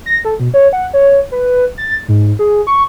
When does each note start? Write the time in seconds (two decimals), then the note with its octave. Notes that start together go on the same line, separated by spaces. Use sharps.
0.06 A#6
0.25 A4
0.40 B2
0.54 C#5
0.73 F#5
0.93 C#5
1.32 B4
1.78 A6
2.08 G#2
2.39 G#4
2.67 C#6